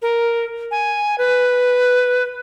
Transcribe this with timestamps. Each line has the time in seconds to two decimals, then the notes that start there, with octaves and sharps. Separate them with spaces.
0.02 A#4
0.71 G#5
1.18 B4